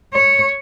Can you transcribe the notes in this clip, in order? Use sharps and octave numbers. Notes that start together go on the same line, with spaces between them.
C#5